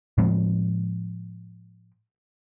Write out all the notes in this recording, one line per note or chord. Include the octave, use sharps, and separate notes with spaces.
A2 F3 G#3 C4